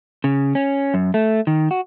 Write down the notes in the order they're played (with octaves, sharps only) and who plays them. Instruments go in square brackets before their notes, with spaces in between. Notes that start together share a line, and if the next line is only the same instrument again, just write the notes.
[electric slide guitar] C#3
C#4
F#2
A3
D#3
F#4